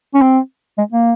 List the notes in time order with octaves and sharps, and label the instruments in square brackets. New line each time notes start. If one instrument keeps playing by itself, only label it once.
[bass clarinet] C#4
C4
G#3
A#3